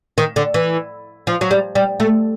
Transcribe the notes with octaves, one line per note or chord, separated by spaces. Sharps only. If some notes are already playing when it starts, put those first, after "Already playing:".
D#3
D3
E3
F3
F#3
G3
G3
A3